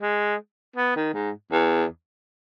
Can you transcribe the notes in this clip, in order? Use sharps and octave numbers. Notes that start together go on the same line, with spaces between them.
G#3
B3
D#3
G#2
E2